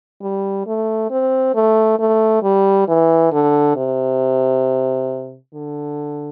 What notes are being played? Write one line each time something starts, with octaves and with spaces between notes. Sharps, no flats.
G3
A3
C4
A3
A3
G3
E3
D3
C3
D3